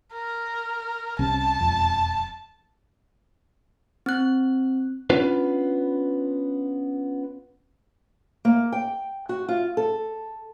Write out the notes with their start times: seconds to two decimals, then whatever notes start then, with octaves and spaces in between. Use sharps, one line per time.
0.13 A#4
1.19 C2 C3 C#4 A5
1.60 E1 F2
4.06 C4 F#6
5.10 B3 C#4 D4 F4 B4
8.45 A#3
8.72 G5
9.29 F#4
9.48 F4
9.77 A4